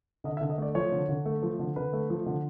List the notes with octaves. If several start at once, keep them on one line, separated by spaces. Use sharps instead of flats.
D3 D#5
E5
D3
D#5
A3 D5
F3 C#5
D3
D3
A3
F3
D3
D3 B4
A3
F3
D3